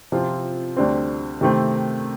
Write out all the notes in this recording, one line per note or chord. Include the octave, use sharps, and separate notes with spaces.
C3 F3 C4 F4
D2 D3 G3 C4
C3 D#3 A3 C4